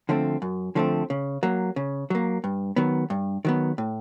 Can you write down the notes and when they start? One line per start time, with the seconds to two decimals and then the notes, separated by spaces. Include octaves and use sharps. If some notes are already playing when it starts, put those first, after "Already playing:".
0.09 D3 F3 A3 C4
0.42 F#2
0.75 D3 F3 A3 C4
1.10 C#3
1.43 F#3 A#3
1.76 C#3
2.10 F#3 A#3
2.44 G2
2.76 D#3 F#3 B3
3.10 G2
3.45 D#3 F#3 B3
3.78 A2